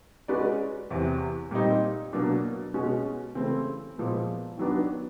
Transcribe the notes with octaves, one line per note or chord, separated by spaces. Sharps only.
G#3 C#4 F#4 B4 D5
E2 C3 E3
A#2 G3 C4 D#4
B2 F#3 A#3 D4
B2 G#3 C#4 F#4
C#3 E3 A3 C4 E4
A#2 F3 G#3 B3
D#3 F#3 B3 D4